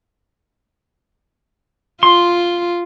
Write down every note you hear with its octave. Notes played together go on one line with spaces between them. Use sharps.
F4 C6